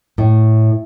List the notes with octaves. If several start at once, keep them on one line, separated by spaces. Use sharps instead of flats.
A2